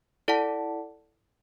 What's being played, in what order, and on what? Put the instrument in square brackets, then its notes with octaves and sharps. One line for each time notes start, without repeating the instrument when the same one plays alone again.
[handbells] E4 A4 D5 F#5 A5